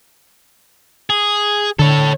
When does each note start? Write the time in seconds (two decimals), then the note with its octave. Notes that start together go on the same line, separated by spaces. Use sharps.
1.10 G#4
1.79 D3 A4 C#5